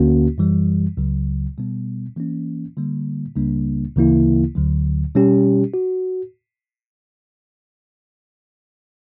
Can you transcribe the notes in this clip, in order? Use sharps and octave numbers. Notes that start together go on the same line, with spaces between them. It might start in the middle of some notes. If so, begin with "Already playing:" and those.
Already playing: D2 D3 A#3 C#4 F#4
F#2 E3 G3
C#2 C#3 F#3
B2 G3 B3
E3 A#3 C#4
D3 G3 A#3
C#2 C#3 G3 A#3 D4
D2 C#3 E3 A#3 E4
D2 D3 F#3
B2 G3 C#4 G4
F#4